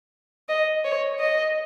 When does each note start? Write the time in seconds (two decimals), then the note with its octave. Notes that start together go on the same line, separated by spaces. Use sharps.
0.49 D#5
0.84 C#5
1.19 D#5